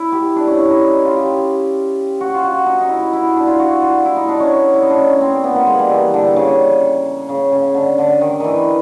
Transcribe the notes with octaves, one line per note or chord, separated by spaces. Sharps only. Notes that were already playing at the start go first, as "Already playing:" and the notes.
Already playing: E4
G4
D4
C#4
E4
D#4
E4
F4
G4
F#4
F4
F#4
D#4
D#4
E4
E4
D4
F4
F#4
F4
E4
D#4
D4
C#4
E4
D#4
D4
C#4
C#4
C4
B3
A#3
G#3
G3
E3
D3
C#3
C#3
C#3
D3
D3
D#3
D#3 E3